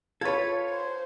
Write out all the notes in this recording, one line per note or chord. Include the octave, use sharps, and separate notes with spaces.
F4 A4 B4 C#5 G#6
C5